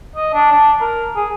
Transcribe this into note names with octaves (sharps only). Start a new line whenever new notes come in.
D#5
D4
D4
A#4
G#4